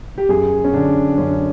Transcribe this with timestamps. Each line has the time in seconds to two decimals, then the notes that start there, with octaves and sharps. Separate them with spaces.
0.18 G4
0.29 F#2 G#4
0.64 C#4
0.74 D3 D4
1.18 F#2 C#4